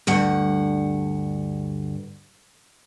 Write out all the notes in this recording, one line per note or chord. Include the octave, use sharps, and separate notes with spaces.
D2 G2 F#5